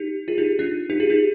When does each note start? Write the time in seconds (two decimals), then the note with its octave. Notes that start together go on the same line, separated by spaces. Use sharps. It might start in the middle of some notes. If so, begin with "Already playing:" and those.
Already playing: D#4 G4
0.28 F4 G#4
0.38 D#4 G4
0.59 D4 F4
0.90 D#4 G4
1.00 F4 G#4
1.10 D#4 G4